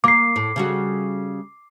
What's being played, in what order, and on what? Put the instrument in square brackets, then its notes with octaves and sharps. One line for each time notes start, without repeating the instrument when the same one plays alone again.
[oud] A#3 [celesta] D6 C7
[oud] A2
C#3 G3 F#4